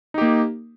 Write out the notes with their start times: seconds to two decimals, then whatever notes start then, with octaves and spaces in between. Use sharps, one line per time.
0.14 D#4
0.18 G4
0.21 A#3